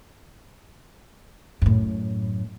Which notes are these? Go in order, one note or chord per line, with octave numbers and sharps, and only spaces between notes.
F#2 A2